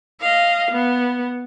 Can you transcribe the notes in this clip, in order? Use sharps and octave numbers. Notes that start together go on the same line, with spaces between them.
D#5 F5
B3